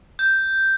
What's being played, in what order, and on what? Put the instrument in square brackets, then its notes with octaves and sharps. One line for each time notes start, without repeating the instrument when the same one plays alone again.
[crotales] G6